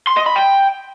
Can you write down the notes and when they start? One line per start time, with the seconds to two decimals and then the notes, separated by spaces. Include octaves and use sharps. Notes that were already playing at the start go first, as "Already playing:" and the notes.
0.07 C6
0.17 D#5
0.26 B5
0.36 G5